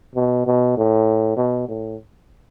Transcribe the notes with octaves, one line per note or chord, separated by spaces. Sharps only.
B2
B2
A2
B2
A2